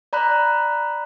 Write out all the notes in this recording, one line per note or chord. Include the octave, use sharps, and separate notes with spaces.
D5 A#5 B5 F#6